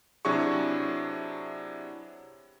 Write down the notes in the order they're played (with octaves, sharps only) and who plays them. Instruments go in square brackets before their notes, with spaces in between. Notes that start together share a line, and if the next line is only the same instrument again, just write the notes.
[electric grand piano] C3 F#3 D4 E4 G#4 C#6